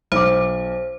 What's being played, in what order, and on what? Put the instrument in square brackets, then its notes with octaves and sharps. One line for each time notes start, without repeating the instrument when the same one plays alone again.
[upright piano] B1 D6 [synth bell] C5